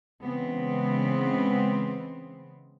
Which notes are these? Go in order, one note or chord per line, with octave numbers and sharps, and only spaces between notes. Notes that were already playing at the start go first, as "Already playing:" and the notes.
C#3 E3 G#3 B3 C4